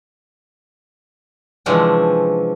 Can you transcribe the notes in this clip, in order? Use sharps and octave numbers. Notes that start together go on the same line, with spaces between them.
C3 E3 F3 G#3 C#4 D4